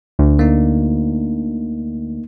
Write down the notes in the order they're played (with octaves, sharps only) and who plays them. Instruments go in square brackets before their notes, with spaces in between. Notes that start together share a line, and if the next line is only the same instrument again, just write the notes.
[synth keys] D2
[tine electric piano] A#3 D#4